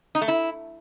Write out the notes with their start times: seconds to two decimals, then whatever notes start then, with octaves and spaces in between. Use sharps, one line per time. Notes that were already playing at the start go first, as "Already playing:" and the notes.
0.15 D#4
0.21 A3
0.28 E4